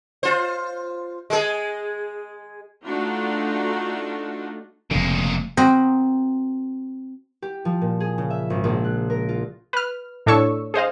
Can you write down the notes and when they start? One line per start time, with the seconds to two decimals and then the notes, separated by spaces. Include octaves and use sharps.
0.23 F4 C5
1.30 G#3 G#4
2.86 A3 D4 D#4 F4 F#4
4.91 F1 A#2 C#3 G#3
5.57 C4 F#4 A#4 C5 D#5 B5
7.42 G4
7.65 F3
7.81 A#2
8.00 G#4
8.18 C#3
8.30 E5
8.50 G#1
8.64 A#1
8.84 F#6
9.10 A#4
9.29 F4
9.73 B4 F6
10.26 A2 D4 A4 C#5 C#6 E6
10.74 G#4 C5 D#5 F5